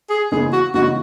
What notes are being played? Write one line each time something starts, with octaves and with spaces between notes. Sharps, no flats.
G#4
E2 C#3 G#3 D#4 G#4
F#4
E2 C#3 G#3 D#4 F#4